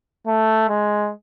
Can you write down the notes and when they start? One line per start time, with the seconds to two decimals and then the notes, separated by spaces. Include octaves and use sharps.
0.27 A3
0.69 G#3